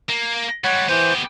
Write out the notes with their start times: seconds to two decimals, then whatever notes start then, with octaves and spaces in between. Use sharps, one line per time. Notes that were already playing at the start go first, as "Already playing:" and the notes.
0.09 A#3
0.64 G3 G#3 C#5 F#5
0.88 E3 B3 G4 C5